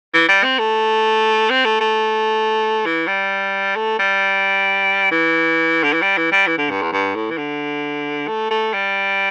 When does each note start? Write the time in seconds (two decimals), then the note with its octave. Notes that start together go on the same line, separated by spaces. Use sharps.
0.14 E3
0.29 G3
0.44 C4
0.59 A3
1.50 C4
1.65 A3
1.80 A3
2.86 E3
3.08 G3
3.76 A3
3.99 G3
5.11 E3
5.83 D3
5.93 E3
6.02 G3
6.18 E3
6.32 G3
6.47 E3
6.58 D3
6.71 G2
6.82 E2
6.92 G2
7.16 A2
7.30 E3
7.38 D3
8.28 A3
8.51 A3
8.73 G3